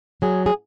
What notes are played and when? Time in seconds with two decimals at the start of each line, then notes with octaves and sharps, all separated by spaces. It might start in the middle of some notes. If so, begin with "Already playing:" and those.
0.22 F#3 G#4
0.46 G#4